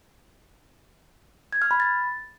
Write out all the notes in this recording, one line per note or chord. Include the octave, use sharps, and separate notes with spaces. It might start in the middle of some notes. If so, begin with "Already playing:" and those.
G#6
F6
B5
A6